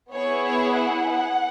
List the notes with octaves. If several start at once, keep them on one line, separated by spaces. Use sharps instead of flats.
B3 E4 G#4 C#5
C#5
F#5